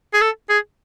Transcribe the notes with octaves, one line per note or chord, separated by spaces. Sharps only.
G#4
A4
G#4